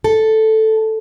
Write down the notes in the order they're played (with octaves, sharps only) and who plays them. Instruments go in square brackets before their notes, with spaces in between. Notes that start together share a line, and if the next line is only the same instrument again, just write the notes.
[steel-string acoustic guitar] A4